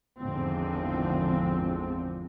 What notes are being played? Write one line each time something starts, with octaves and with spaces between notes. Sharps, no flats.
G#1 E2 G#2 D3 F3 C4